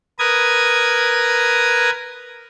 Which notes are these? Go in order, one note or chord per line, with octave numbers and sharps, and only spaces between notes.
A#4 B4 D#6 G#6